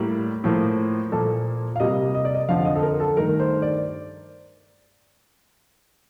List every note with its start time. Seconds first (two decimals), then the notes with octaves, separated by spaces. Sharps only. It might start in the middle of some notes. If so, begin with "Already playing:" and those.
Already playing: A2 G3 A#3
0.44 A2 F3 A#3
1.12 A#2 F3 A#3 A4
1.76 F5
1.80 C3 G3 A#3 D#5
2.15 D#5
2.25 D5
2.35 D#5
2.48 F2 D3 F3 F5
2.65 D#5
2.75 A4
2.83 A#4
3.00 A4
3.17 G2 D#3 A3 A#4
3.40 C5
3.62 D5